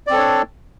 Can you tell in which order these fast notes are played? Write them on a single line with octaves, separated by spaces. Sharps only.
D5 C4 A4 C#5 D4